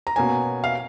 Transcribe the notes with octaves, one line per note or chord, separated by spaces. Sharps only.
A#5
B2 A#3 C#4 G#5
F5